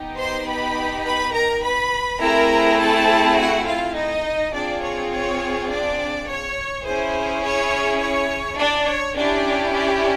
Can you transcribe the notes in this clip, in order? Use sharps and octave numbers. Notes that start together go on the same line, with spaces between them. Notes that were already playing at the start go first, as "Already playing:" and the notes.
Already playing: B3 D#4 G4
C5 C6
B4 B5
B4 B5
A#4 A#5
B4 B5
A3 C4 E4 G#4 A#4 A#5
A4 A5
F#4 F#5
F4 F5
D#4 D#5
C4 D4 F4 G#4 D5
C#5
C#5
D4 D5
C#5
C#4 E4 G#4 C5
C#5
C#5
D4 D5
C#5
C#4 D4 E4 G4 D5
D4 D5